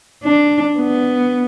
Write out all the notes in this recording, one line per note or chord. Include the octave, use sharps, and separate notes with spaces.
D4
B3